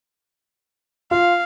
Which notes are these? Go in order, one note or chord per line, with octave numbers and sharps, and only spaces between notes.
F4 F5